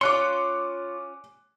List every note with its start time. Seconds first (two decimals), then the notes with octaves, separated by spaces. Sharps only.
0.01 C#4 F4 C6 D6 F#6 C#7